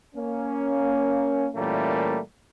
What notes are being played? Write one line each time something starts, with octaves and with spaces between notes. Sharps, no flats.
A#3 C#4
A#2 E3 G3 A3 A#3 C#4